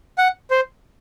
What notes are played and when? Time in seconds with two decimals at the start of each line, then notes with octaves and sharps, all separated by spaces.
0.18 F#5
0.51 C5